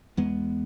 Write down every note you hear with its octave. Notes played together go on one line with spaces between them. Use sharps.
E2 G#3 B3